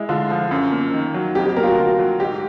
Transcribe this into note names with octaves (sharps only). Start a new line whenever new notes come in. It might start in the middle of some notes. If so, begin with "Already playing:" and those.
Already playing: G#3 E4
D3 F4
F3
F#2
A#3
D#3
F#3
F2 G4
G4
A#3 A#4
F4
F#4
D3
F#3
G#2 G4